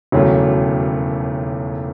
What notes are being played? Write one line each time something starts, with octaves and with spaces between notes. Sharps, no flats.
E1 D#2 C#3 F#3 A3